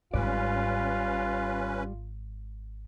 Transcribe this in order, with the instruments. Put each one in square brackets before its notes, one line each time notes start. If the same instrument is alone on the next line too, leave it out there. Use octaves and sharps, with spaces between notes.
[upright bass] G#1 G#2 [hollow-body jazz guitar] G3 D5 [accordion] C#4 B4 [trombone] F4